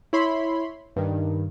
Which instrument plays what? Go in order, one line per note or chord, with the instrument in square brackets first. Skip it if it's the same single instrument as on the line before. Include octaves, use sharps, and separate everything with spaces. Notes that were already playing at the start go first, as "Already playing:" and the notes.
[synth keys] E4 C#5 B5 C6
G2 D#3